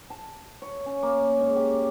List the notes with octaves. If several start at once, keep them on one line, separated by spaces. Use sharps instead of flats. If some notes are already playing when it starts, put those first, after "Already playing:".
A5
C#5
C#4
A#3
G#2
G4